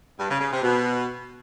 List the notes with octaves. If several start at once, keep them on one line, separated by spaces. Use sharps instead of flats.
G2
C#3
C#3
C3
B2